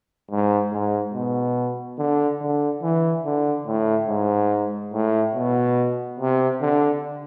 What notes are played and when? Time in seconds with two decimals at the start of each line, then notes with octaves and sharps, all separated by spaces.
0.31 G#2
0.73 G#2
1.14 B2
1.99 D3
2.41 D3
2.83 E3
3.25 D3
3.67 A2
4.09 G#2
4.94 A2
5.35 B2
6.20 C3
6.61 D3